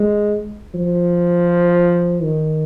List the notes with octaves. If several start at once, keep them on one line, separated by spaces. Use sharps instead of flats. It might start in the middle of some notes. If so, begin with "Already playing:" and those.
Already playing: G#3
F3
D#3